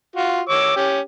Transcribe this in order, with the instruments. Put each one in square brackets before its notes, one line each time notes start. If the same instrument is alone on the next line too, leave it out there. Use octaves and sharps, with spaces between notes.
[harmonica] F4 F#4
C#5 D6 E6
C#4 G4